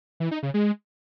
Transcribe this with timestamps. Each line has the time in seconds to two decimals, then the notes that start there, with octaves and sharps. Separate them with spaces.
0.20 E3
0.31 D#4
0.43 C#3
0.54 G#3